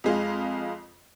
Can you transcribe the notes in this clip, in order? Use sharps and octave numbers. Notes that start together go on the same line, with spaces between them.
F2 G#3 F4